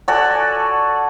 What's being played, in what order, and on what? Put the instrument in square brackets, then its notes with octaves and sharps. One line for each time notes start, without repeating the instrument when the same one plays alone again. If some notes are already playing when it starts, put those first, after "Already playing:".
[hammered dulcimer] F#4 A4 D5 G#5